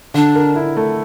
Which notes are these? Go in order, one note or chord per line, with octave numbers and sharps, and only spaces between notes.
D3 D4
A#4
E4
A3